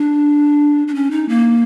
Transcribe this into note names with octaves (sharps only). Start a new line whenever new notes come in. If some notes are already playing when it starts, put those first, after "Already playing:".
Already playing: D4
D4
C#4
D#4
A#3